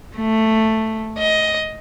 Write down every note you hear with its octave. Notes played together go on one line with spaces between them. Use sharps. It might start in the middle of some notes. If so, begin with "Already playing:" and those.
A3
D#5